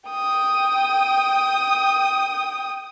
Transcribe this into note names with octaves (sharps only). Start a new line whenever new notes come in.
G5 D#6